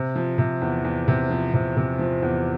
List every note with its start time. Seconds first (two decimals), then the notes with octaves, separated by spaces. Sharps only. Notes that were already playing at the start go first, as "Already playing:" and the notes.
Already playing: C3
0.16 F3
0.38 C3
0.62 E2
0.85 E2
1.08 C3
1.31 F3
1.54 C3
1.77 C3
1.99 F3
2.22 E2